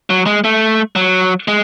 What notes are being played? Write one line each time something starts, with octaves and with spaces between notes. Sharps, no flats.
F#3
G#3
A3
F#3
G#3